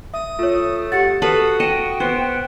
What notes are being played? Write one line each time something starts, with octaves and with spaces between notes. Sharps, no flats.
E5 D#6
A3 F4 C#5
G4 F#5 A6
F#4 A4 B4 F5 D#6
D#5 G5 C#7 E7
B3 C5